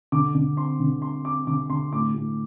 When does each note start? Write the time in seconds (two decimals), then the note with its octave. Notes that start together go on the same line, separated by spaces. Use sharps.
0.12 D3 D6
0.34 D3
0.57 C4 C6
0.80 D3
1.02 C4 C6
1.25 C4 D6
1.47 D3 D6
1.70 D3 C6
1.92 A2 D6
2.14 A2